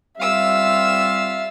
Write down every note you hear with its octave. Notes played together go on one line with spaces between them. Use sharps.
G3 C4 F4 E5 F5 E6